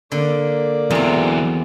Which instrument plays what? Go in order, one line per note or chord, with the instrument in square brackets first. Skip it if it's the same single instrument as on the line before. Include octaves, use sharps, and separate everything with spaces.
[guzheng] D3 [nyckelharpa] A#3 D5
[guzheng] E2 C4 [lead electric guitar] E3 F#3